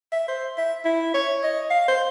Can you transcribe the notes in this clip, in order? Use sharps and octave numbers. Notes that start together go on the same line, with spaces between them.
E5
C5
E5
E4
C#5
D#5
F5
C5